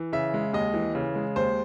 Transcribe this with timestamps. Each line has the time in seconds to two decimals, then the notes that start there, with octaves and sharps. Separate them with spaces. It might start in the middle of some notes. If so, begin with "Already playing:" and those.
Already playing: E3
0.12 C#3 E5
0.34 G#3
0.53 D#2 D#5
0.74 E3
0.95 C#3
1.15 G#3
1.36 D#2 C5